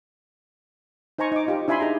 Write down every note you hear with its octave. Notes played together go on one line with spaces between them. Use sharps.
D#4 C5 G#5 A#5 C#6
D#4 D6
D#4 F4 G4
D4 E4 E5 G#5 B5 C6
D#4 G#4 A#5